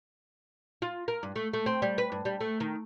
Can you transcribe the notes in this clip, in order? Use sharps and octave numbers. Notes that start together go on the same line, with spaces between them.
F4
A#4
G2
A3
A3
C4
G3
B4
G2
G3
A3
D#3